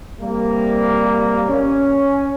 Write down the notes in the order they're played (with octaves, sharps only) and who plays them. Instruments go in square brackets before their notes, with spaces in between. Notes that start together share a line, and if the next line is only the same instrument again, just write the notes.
[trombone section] C3 G3 A#3
C#4